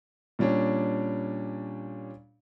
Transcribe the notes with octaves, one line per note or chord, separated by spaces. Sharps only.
A#2 G3 C#4 D4